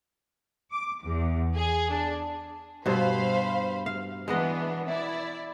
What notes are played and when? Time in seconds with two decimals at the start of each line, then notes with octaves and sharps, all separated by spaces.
0.71 D6
1.03 E2
1.55 G#4
1.90 D4
2.86 G2 B2 C5 F5 B5
3.86 F5
4.28 E3 G#3 B3 D4 B4 D#5
4.87 E4 D5